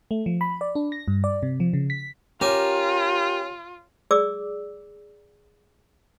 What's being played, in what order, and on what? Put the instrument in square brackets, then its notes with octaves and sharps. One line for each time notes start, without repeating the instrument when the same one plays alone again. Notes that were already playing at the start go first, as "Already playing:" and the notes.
[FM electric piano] A3
F3
B5
D5
D4
A#6
G2
D5
C3
F3
C#3
B6
[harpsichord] C#4 [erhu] F4 [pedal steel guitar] G4 A#4 D6
[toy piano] G#4 D5 D6 E6